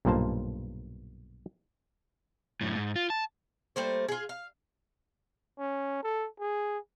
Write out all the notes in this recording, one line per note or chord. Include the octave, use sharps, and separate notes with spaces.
B1 G2 A#2 A#3 C5 A5
F#2 A2
G#2
F4
A5
G3 A3 A#3 C5
F4 G#4
F5
C#4
A4
G#4